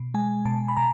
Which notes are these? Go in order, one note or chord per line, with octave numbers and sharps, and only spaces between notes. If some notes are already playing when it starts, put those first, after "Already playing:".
Already playing: B2
G#3 G#5
B2 A5
B5
B2 A#5